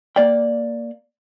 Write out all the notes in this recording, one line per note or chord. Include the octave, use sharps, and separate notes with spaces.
A#3 D5 G5